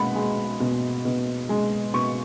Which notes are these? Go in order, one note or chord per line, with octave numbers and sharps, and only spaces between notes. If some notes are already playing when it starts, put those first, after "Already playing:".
Already playing: B2 G#3 F#5 B5
G#3
B2
B2
G#3
B2 C#6